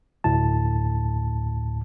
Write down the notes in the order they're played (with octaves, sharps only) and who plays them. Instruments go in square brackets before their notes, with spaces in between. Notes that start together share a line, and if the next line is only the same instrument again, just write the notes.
[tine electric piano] D2 A2 A5